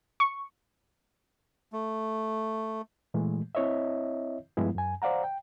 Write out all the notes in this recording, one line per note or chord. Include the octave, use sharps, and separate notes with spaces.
C#6
A3
A#2 E3 G#3 A3
C4 E4 C#5 D#5 E5
G2 F3 G#3 B3 E4
F#2 G#5
C5 D5 F5 F#5 A#5
G5